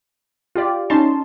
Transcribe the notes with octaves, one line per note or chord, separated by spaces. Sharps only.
F4 G4 D5
C#4 D#4 A5 C6